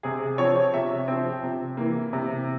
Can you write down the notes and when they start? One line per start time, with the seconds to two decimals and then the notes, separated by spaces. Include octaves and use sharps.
0.03 C3 G#4
0.38 F3 C4 C#5
0.56 C#5
0.74 C3 E5
1.08 F3 C4
1.43 C3
1.77 E3 A#3
2.13 C3